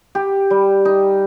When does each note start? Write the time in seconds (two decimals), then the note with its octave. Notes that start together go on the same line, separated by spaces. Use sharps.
0.15 G4
0.50 G3
0.85 D#4